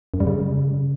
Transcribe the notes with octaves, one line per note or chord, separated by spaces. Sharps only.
F#2
G3
C#3